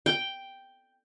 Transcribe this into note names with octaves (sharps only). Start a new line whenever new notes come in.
G5